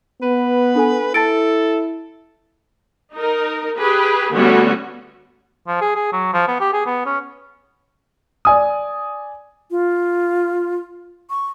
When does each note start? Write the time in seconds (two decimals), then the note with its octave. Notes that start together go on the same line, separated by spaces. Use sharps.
0.22 B3 B4
0.75 D4 A4 G#5
1.14 E4 A4 A5 A6 D7
3.15 D#4 A#4
3.77 G4 G#4 B4
4.33 D3 G3 A3 B3 C#4 F#4
5.67 F3
5.81 G#4
5.95 G#4
6.13 F#3
6.33 F3
6.48 B3
6.60 G4
6.73 G#4
6.86 B3
7.06 C#4
8.45 D5 G#5 D#6
9.71 F4
11.30 C#6